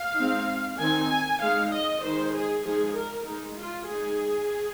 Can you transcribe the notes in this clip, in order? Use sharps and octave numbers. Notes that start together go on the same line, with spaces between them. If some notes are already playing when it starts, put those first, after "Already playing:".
Already playing: F5
G#3 C4 D#4
D#3 C4 D#4 G#5
G#3 D#4 F5
D#5
D#3 G#3 D#4 C5
G#4
F3 G#3 D#4 G#4
A#4
G#3 D#4
F4
G#3 D#4 G#4